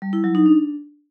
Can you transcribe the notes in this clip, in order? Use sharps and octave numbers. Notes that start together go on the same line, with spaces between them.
G3
E4
F#3
D#4
D4